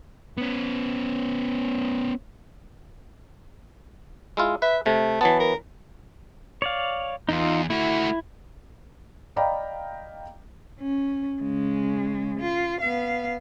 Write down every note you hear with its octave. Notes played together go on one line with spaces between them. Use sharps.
B3 C#4
G#3 E4 F4
B4 E5
C3 A3
E3 F#3 B3 A5
A#4
C#5 D5 F5
E2 D#4 F4
A3 E4 F#4
D5 D#5 F5 G5 A#5 B5
C#4
C#3 G#3
F4
B3 F5